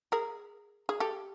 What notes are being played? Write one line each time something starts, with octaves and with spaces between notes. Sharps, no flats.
G#4 A#4
G#4
G4 A4